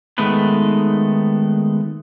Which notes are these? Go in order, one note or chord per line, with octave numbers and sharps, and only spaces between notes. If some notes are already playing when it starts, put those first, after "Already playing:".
D#3 G#3 A3 B3 B4